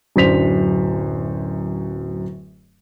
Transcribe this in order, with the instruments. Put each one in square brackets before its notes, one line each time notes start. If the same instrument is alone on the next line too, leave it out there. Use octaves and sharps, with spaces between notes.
[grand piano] D1 F#2 D4 C5 B6 F7